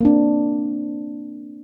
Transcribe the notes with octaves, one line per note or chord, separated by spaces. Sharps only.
A#3 C4 D4